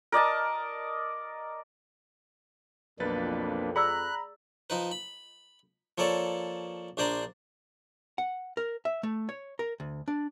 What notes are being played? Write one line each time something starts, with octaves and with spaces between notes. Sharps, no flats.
A#4 D5 D#5 A5
B1 F2 A#3 D4 B4 A6
G#4 D5 A#5 B5 E6 F#6
F3 D#4 B4
B5
F3 A#3 A4 C#5 D5
A#1 D4 C5 D5 A#5 C6
F#5
A#4
E5
A3
C#5
A#4
D2
D4